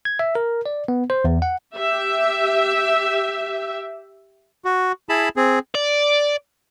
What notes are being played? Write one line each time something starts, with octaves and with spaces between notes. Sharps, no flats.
G#6
E5
A#4
D5
B3
C5
E2
F#5
G4 E5
F#4
E4 G#4 A5 B5
C4 G#4
D5